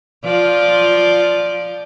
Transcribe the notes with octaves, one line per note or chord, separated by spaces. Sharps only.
F3 F4 D5